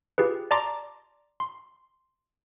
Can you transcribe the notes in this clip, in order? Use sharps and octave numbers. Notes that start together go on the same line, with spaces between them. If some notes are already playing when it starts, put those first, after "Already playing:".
F4 G4 G#4 B4
D5 A5 A#5 C6 D6 A#6
C6